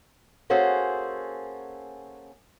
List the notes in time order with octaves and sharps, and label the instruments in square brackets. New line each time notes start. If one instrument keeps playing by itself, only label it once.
[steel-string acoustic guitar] A#3 C#4 F#4 G#4 A4 C5